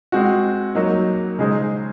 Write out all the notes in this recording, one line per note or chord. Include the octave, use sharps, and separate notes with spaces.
G#3 C4 F#4
F#3 A#3 D#4 F#4
C#3 G#3 D#4 G#4 C5